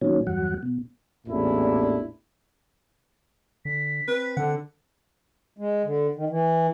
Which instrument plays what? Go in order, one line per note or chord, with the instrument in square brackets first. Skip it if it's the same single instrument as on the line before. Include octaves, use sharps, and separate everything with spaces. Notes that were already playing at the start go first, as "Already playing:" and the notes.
[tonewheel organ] A#2 D#3 F#3 C#4
E2 G2 F#3 F#5
B2
[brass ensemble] A1 E2 A#2 D4 E4
[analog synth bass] D3 [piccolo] B6
[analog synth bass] C4 [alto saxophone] B4
[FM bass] D3 [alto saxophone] F#5
[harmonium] G#3
D3
D#3
E3